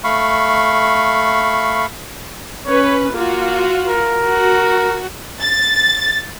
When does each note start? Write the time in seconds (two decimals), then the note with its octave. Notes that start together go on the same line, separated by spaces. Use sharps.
0.04 A3 F5 B5 C#6
2.67 C#4 B4 C#5
3.13 A#3 F4 F#4
3.87 A#4
4.22 F#4
5.41 A6